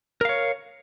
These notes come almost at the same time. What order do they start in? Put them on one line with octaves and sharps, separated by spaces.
A#4 F5 C#5